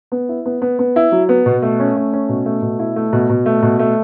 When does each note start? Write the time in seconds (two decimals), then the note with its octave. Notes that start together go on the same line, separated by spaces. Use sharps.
0.12 B3
0.29 E4
0.46 B3
0.62 B3
0.79 B3
0.96 E4
1.12 F#3
1.29 B3
1.46 B2
1.62 A3
1.80 C#4
1.96 A3
2.13 C#4
2.29 B2
2.46 A3
2.62 B2
2.79 E4
2.96 A3
3.13 B2
3.29 B2
3.46 A3
3.63 B2
3.79 A3